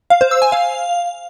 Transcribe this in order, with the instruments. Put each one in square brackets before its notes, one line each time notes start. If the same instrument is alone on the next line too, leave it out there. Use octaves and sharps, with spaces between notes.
[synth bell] F5
C5
E6
G#5
F5